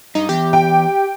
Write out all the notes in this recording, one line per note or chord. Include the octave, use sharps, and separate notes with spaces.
G2 D#4
E2 G4
G5